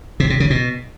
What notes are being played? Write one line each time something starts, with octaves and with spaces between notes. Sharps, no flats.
C3
C3
C#3
B2